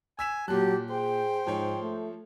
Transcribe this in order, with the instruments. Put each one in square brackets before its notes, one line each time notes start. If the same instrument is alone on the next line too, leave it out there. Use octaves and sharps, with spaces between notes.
[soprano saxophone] G#5 [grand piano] E6 B6 E7
[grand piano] A#2 F#6 [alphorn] F#3 [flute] G4 [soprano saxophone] A5
[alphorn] G#4 [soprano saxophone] C5 [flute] G5
[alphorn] G#2 [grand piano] F3 C#5
[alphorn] A3